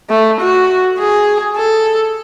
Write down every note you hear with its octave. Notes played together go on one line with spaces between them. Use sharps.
A3
F#4
G#4
A4